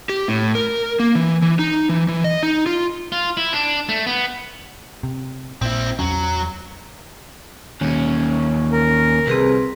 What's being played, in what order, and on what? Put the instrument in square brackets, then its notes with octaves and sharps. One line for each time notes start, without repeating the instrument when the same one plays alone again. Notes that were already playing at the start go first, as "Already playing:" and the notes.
[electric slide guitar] G4
A2
A#4
A#3
E3
E3
D#4
E3
E3
D#5
D#4
F4
[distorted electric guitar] F4
E4
D4
A3
B3
[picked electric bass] C3
[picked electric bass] A#1 A#2 [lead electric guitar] C4 E4
[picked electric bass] E2 C#4 [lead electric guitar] F#3
[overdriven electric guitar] D#2 C#4
[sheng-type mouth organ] A#4
[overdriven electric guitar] C2 [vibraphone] C4 G#4 B4